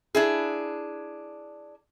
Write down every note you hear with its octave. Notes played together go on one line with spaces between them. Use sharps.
D4 E4 G#4